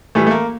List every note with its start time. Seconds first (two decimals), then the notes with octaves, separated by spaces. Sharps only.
0.15 A2 E3 G3 A3
0.27 A3
0.31 A#3